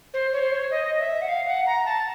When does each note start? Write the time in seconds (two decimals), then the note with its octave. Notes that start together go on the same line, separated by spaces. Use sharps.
0.14 C5
0.33 C#5
0.42 C5
0.52 C#5
0.71 D#5
1.00 E5
1.22 F#5
1.29 F5
1.47 F#5
1.66 A#5
1.85 A5